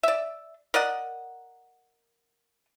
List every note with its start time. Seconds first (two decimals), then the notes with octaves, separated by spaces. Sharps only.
0.03 D5 E5
0.74 A#4 D5 D#5 F#5